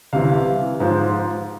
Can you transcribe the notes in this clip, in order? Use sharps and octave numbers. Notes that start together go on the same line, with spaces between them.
C2 C3 E3 F5
G#2 F3